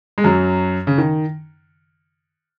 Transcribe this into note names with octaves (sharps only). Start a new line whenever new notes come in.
G#3
F#2 F#3
C#3
D#3